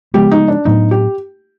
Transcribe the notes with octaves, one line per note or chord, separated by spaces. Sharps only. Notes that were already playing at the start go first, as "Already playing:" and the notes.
C#3 F3 G#3 B3 G4
D#4
D4
A2 F#3 B3 D4 D#4
G4